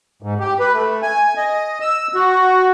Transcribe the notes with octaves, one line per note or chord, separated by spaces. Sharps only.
G#2
G4
B4
A3
G#5
D#5
E6
F#4